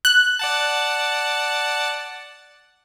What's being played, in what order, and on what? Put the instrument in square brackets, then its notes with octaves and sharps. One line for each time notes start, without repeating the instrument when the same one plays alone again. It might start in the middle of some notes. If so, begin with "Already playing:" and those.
[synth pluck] F#6
[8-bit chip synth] D5 F#5 A5